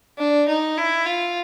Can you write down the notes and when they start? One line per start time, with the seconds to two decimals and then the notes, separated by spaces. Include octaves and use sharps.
0.18 D4
0.48 D#4
0.77 E4
1.06 F4